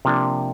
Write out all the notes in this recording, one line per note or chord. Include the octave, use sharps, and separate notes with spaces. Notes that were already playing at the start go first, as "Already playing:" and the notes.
C3 F3 A#3 D4